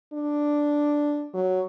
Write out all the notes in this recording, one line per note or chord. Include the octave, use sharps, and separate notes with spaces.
D4
F#3